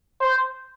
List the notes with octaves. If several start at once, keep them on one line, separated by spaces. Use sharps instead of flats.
C5